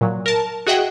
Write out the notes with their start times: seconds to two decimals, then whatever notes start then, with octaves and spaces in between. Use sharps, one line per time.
0.01 A#2 F#3
0.26 A#4 A5
0.66 F#4 G#4 D#5 E5 F#5 G5